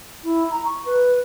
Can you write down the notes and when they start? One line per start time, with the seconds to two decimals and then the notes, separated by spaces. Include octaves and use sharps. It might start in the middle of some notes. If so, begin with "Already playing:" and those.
0.24 E4
0.51 A#5
0.65 C#6
0.85 B4